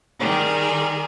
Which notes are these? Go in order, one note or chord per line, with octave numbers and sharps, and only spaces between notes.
D#3 G3 G#4